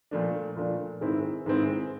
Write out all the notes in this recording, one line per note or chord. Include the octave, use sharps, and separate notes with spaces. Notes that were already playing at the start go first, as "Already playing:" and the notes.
A#2 F3 A3 D4
A#2 F3 A3 D4
G#2 D#3 G#3 C4 E4
G#2 D#3 G#3 C4 E4